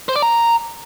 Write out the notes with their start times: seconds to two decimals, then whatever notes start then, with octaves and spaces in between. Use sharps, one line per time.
0.09 C5
0.16 D5
0.22 A#5